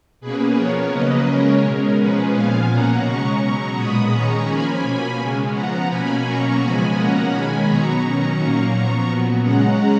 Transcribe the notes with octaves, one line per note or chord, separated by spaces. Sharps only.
B2 A#3 C#4 G#4 B4
F3 B3 A#4 C#5
C#3 F#3 A#3 B4 D#5
C#3 G#3 C#4 A#4 C#5
B2 G#3 C#4 A#4
F3 G#3 C#4 G#4 B4
A#2 F3 B3 F5 G#5
B2 A#3 C#4 F#5 A#5
C#3 G#3 C#4 A#5 C#6
B2 F#3 B3 A#5 C#6
A#2 G#3 B3 B5 D#6
D#3 G#3 C#4 A#5 C#6
F3 A#3 C#4 G#5 B5
B2 A#3 C#4
C#3 G#3 C#4
F3 B3 F#5 A#5
B2 A#3 C#4 G#5 B5
B2 F#3 A#3 C#4 A#5 C#6
C#3 F3 G#3 B3 G#5 B5
B2 A#3 C#4 F#5 A#5
D#3 G#3 C#4 G#5 B5
B2 F#3 B3 A#5 C#6
D#3 F#3 C#4 A#5 C#6
A#2 F#3 A#3 C#4 A#5 C#6
F3 B3
A#2 F#3 B3
C#3 G#3 C#4 F#5 A#5